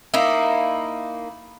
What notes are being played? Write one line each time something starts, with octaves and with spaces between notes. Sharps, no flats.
A#3 D#4 E4